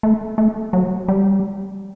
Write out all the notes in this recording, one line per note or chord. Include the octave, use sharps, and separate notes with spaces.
A3
A3
F#3
G3